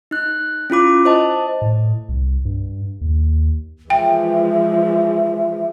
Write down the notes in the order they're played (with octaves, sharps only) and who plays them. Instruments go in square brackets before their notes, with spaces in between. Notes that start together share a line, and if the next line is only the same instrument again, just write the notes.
[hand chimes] D#4 F#6
C#4 E4 F4 D6
C5 D#5 A5
[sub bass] A2
C2
G2
D#2
[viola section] E3 F3 G#3 [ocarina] E5 [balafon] G5